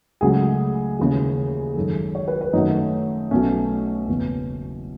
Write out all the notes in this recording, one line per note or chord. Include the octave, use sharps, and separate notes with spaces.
C#2 C#3 F#3 A3 G#4
D#2 C#3 E3 G#3
G#1 F#2 D#3 F#3 A4
C#5
B4
B4
F#2 D#3 F#3 A3 D#4
B1 B2 A3 C#4
F#1 E2 B2 B3